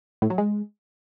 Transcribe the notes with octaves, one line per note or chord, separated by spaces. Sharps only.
A2
F#3
G#3